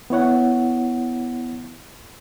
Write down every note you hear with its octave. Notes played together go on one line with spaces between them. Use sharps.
B3 E4 C#5 F#5